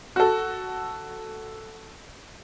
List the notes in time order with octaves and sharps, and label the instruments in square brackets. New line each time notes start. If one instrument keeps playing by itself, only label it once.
[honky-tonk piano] F#4 A4